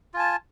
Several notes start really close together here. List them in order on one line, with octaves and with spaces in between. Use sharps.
F4 G#5 A5